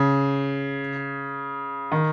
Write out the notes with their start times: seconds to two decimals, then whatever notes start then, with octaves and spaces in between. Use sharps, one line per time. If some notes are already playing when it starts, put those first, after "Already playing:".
Already playing: C#3
1.92 D#3